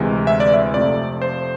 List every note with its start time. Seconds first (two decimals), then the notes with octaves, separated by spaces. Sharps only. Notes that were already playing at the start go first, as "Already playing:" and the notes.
Already playing: D2 C3 E3 G#3
0.27 E5
0.40 D5
0.54 E5
0.74 F2 C3 F3 A3 D5
1.22 C5